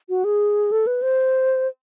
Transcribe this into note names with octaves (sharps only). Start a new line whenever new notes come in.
F#4
G#4
A4
B4
C5